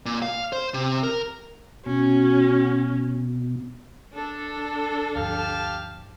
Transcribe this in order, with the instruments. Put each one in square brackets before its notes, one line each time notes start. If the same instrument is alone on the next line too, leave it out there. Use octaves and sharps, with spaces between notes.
[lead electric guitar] A#2
F5
C5
C3
A#4
[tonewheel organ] B2 [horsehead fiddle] C#4 [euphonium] F#4
[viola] D4 A4
[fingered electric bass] D2 G2 F3 [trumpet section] G4 F5 A5